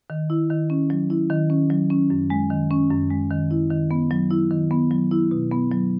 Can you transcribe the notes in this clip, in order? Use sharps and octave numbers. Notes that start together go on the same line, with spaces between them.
D#3
E4
D#3
C#4
F#3
E4
D#3
C#4
F#3
C#4
F#2
G#3
D#3
C#4
F#2
G#3
D#3
E4
D#3
B3
F#3
E4
D#3
B3
F#3
E4
B2
B3
F#3